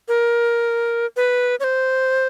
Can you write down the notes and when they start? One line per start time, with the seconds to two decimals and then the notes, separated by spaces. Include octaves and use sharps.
0.08 A#4
1.17 B4
1.60 C#5
1.64 C5